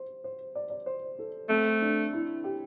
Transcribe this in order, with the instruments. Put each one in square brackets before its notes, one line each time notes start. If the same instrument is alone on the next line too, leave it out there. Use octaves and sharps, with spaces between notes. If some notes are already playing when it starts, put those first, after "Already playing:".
Already playing: [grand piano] C5
C5
D5
D5
C5
A4
[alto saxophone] A3 [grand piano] C4
[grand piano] D4
E4
G4